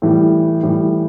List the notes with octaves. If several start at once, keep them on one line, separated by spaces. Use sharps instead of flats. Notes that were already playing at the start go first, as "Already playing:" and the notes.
A2 E3 G3
A2 E3 G3